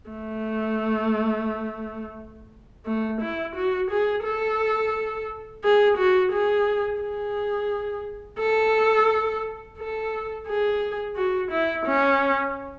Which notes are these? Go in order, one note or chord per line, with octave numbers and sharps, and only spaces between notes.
A3
A3
E4
F#4
G#4
A4
G#4
F#4
G#4
G#4
A4
A4
G#4
F#4
E4
C#4